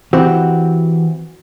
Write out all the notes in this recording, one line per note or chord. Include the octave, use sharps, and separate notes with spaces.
E3 C4 F#4 G4